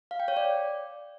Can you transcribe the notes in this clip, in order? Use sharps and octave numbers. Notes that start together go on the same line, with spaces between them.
F5
G5
C#5
D5